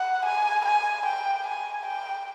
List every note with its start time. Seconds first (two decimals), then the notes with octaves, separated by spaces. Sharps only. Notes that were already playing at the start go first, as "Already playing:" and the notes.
Already playing: F#5
0.25 G#5
0.65 G#5
1.05 G5
1.46 G#5
1.85 G5